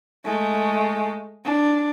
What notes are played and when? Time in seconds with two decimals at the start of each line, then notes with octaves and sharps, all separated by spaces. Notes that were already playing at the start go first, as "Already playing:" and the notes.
0.25 G#3 A3
1.45 D4